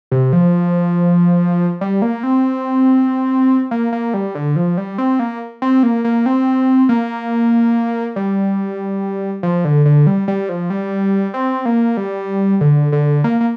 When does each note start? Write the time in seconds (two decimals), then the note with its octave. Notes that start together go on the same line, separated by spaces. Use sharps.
0.12 C3
0.33 F3
1.81 G3
2.02 A#3
2.23 C4
3.71 A#3
3.92 A#3
4.14 G3
4.35 D3
4.56 F3
4.77 G3
4.98 C4
5.19 A#3
5.62 C4
5.83 A#3
6.05 A#3
6.26 C4
6.89 A#3
8.16 G3
9.43 F3
9.65 D3
9.86 D3
10.07 G3
10.28 G3
10.49 F3
10.70 G3
11.34 C4
11.66 A#3
11.97 G3
12.61 D3
12.92 D3
13.24 A#3
13.41 A#3